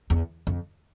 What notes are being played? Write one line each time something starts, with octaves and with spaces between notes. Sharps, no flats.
E2
F2